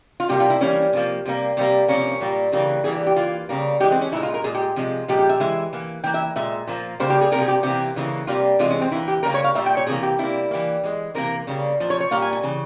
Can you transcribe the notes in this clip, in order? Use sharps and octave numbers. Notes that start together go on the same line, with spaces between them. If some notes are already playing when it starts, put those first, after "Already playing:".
F4
C3 G3 A#3 G4
F4
E4
E3 G3 A#3 C#4
C3 F3 A#3
C3 G3 A#3
C3 G3 A#3
C3 F3 A#3 C#4
A#2 G3 A#3
C#3 E3 G3 A#3
E3 G3 A#3 G#4
G4
G4
E3 A#3 F4
C#3 G3 A#3
E3 G#3 G4
C4
C#4
A#2 G#3 E4
F4
A#4
A#2 G#3 G#4
G4
C3 F3 G#3
A#2 F3 G#3 G4
G4
E5
E3 G#3 E5
E3 A#3
E3 A#3 G5
E5
A#2 G#3 E5
A#2 F3 A#3
C#3 G3 A#3 C5
G4
G#4
C3 G3 A#3 A#4
G#4
G4
C3 E3 A#3 G4
C#3 E3 G3 A#3
C3 G3 A#3 F4
C3 E3 G#3 F4
C#4
C4
E3 A#3 E4
G4
C#3 G3 A#3 A#4
C#5
F5
A#2 G3 A#3 E5
G5
C#5
C3 E3 A#3 G#4
G4
C3 G3 A#3 E4
E3 G3 A#3
E3 G#3
C3 E3 A#3 A#4
C#3 G3 A#3
A#2 F3
C#5
C#5
A#2 G3 A#3 F5
G#5
G#5
C#3 E3